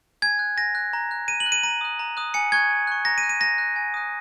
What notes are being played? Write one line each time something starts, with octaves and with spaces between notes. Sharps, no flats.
G#5 G#6
F#6
G#5 A#6
F#6
A#5
F#6
A#5 D#7
F#7
F#6
D#7
A#5 D#7
D#6 F#6
A#5
D#6 F#6
G#5 C#7
C#6 F#6 G#6
G#5
C#6 F#6
A#5 A#6
D#7
F#6
D#7
A#5 A#6
F#6
G#5
D#6 F#6